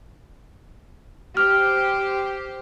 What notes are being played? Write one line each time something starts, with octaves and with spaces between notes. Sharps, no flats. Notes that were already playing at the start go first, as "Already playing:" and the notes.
G4 C5 F6